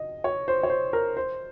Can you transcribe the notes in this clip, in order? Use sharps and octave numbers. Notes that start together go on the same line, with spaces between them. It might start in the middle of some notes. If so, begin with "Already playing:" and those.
Already playing: D#5
C#5
C5
C#5
C5
A#4
C5